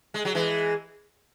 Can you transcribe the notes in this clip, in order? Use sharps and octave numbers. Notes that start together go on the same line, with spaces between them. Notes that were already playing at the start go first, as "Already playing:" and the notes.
G#3
F#3
E3 G#3